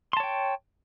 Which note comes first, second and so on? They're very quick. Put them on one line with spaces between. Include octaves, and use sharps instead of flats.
C6 A5 C#5 G5